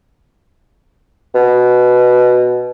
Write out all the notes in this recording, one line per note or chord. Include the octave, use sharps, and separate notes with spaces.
B2